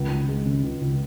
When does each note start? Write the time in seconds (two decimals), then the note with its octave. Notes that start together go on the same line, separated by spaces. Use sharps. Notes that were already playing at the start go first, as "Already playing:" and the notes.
Already playing: C#2
0.10 C#2
0.28 G#3
0.46 C#3
0.63 C#2
0.81 C#2